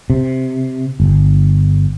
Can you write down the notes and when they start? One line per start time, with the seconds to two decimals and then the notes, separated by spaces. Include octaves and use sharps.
0.10 C3
1.00 G1